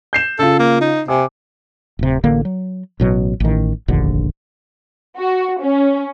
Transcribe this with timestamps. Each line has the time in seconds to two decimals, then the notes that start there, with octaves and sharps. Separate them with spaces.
0.13 G6 C7 E7
0.39 C#3 F4 A4
0.59 A#3
0.81 D#4
1.08 C3 G#5 D6
1.99 D1 C3
2.23 A1 D3 A#3
2.45 F#3
3.00 A1 B2 F#3
3.40 A1 D#3
3.88 F1 A#1 D#2 D3
5.18 F#4
5.61 C#4